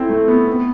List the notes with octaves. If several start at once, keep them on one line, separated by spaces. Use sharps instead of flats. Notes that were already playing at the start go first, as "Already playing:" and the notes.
Already playing: C4 E4 A4
A3
B3
B3